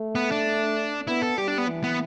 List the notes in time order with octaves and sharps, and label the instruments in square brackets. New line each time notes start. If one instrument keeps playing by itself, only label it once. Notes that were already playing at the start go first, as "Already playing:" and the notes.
Already playing: [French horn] A3
[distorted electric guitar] B3
D4
[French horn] B3 [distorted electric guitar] E4
[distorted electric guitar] A4
[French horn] G3 [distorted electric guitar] G4
[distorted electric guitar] D4
B3
[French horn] E3
[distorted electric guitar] B3